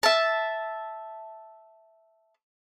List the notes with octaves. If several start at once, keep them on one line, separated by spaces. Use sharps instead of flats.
E5 A5